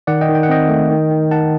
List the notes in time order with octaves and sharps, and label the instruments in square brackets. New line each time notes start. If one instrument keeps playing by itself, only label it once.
[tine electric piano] D#3 D5 F#5
D#5 G5
D#3
G5
F#5
C4 D#5 G5
A3
D#3
D#3
D#3 F#5 A5